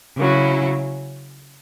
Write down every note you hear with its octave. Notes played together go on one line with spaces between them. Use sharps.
C#3 F#3 C#4 E4